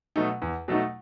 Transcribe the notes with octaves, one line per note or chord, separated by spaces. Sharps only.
B2 F#3 A3 D#4
E2
B2 F#3 A3 D#4